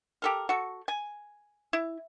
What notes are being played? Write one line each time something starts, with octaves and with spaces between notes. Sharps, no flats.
G4 A4 A#4
F#4 A4
G#5
E4